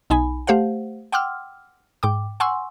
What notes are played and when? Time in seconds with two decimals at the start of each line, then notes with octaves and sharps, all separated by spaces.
0.10 B1 D#4 G#5 B5
0.47 A3 G4 C5 F5 F#5
1.12 F#5 G5 C6 D6 E6 F6
2.03 G#2 G5 D6
2.40 F#5 G#5 C6 C#6 E6